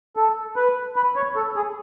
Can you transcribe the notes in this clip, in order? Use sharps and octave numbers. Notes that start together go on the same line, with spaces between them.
A4
B4
B4
C#5
A4
G#4